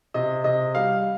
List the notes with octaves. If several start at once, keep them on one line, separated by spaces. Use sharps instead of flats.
C3 D#5
C3 D#5
G3 F5